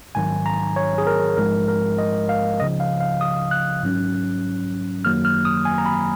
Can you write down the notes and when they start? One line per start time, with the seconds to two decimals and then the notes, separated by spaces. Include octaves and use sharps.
0.15 A#1 G#2 D#3 F#3 G#5
0.46 A#5
0.76 C#5
0.98 G#4
1.07 A#4
1.37 A#1 G#2 F3 G#3 A#4
1.68 A#4
1.98 D#5
2.29 F5
2.60 C#2 C#3 F3 D#5
2.80 F5
3.00 F5
3.21 D#6
3.51 F#6
3.82 G#1 G#2 F#3 C#4
5.05 G#1 F#2 D#3 F#3 A#3 F6
5.25 F6
5.45 D#6
5.65 G#5
5.78 A#5
5.86 B5